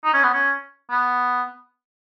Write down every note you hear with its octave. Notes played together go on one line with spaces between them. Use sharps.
D#4
C#4
B3
C#4
B3